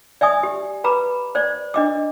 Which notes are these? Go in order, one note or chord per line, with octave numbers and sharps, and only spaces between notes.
D5 E5 G#5 D#6
G4
B4 A#5 B5 D6
C5 D5
D4 D#5 D6